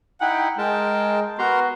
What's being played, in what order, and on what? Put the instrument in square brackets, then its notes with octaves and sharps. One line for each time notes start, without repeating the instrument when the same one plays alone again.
[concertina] D#4 E4 [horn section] F#5 G5
[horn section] G#3 [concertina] A#4 G5 A5
[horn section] B3 F#4 [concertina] A#4 A#5 C6